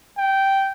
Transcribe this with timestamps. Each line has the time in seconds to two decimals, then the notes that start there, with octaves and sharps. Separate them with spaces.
0.18 G5